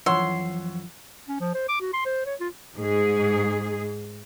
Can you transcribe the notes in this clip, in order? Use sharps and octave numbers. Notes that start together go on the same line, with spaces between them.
F#2 E3 F3 C#5 F#5 C6 E6
C#4
F3
C5
D6
F#4
C6
C5
C#5
F4
G#2 G#4